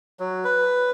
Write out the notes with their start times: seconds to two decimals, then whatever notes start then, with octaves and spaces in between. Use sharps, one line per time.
0.20 F#3
0.44 B4